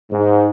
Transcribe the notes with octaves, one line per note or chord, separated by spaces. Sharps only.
G#2